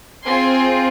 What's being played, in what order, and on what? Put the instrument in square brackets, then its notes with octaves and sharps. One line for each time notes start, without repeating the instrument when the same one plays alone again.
[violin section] C4 F4 G#4 G#5 C6